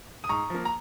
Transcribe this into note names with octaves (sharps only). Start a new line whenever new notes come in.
D#6
G#2 A#5 C#6
F3 A#3
A#5